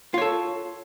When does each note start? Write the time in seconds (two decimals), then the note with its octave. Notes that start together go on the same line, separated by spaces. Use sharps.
0.14 F4
0.18 C#5
0.21 A4